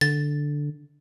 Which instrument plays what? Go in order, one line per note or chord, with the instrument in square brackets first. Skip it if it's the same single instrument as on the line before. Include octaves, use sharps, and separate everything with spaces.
[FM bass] D3 [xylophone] A6